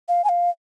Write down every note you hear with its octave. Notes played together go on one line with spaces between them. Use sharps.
F5
G#5
F5